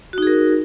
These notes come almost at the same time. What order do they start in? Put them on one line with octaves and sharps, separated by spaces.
F#4 D#4 G#4 A#4